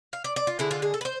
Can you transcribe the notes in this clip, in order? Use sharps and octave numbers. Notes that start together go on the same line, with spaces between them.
F5
D5
D5
F4
D3 G#3 D4 E4
F4
G#4
A4
B4
C5